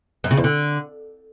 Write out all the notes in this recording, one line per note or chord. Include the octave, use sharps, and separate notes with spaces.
F#2
C#3
E2
D3